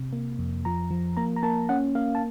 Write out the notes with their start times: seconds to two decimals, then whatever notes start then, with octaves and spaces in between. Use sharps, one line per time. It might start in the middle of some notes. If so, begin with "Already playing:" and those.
Already playing: C3
0.13 A#3
0.39 F2
0.65 F3 A#5
0.91 F3
1.17 A#3 A#5
1.36 A#5
1.43 A#3 A5
1.69 C#4 F#5
1.95 A#3 F5
2.15 A5